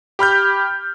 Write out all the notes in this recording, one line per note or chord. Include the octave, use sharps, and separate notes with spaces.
G4 B5 F6 G6